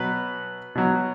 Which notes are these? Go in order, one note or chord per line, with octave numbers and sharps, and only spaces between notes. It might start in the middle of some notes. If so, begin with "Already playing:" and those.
Already playing: B2 F#3 B4
B2 F#3